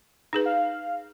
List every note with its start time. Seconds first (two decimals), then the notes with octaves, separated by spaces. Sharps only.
0.33 D#4 G#4 B4
0.45 F5